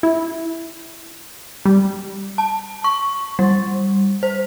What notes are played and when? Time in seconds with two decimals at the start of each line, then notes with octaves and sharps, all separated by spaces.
0.03 E4
1.65 G3
2.38 A5
2.84 C#6
3.39 G3
4.23 C5